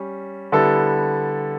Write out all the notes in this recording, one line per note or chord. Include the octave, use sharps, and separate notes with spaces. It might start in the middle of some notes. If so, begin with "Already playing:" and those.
Already playing: G3 C#4
D3 G3 B3 E4 A4